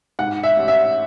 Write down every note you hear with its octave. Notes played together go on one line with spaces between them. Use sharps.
G#2 F#5
E5
A1
E5